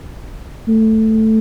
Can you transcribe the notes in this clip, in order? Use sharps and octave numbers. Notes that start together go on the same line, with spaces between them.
A3